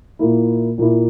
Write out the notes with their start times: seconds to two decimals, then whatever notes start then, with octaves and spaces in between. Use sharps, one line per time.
0.19 A#2 A#3 E4
0.78 A#2 A#3 E4